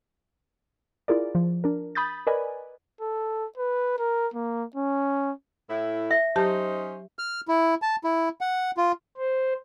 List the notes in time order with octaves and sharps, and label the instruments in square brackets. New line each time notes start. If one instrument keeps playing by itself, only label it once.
[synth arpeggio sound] E4 F4 G#4 A#4 D5
F3
D4 A#4
B5 D#6 G6 A6
A#4 B4 D5 D#5 G#5 B5
[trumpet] A4
B4
A#4
A#3
C#4
[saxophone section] A2 E4
[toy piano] E5
[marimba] F#3 G4 A5 [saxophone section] C#4 D#4 C5
[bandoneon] F6
E4
A5
E4
F#5
F4
[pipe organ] C5